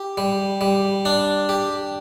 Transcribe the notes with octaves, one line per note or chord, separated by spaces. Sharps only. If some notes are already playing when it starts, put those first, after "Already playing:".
Already playing: G4
G3
G3
D4
G4